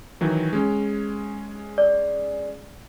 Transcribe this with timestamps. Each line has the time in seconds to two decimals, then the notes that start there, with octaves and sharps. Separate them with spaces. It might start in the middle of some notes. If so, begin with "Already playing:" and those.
0.21 D#3 E3 F#3
0.53 G#3 C#4
1.78 D5